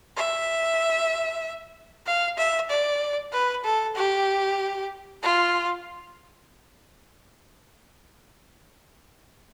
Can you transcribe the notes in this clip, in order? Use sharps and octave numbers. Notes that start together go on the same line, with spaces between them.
E5
F5
E5
D5
B4
A4
G4
F4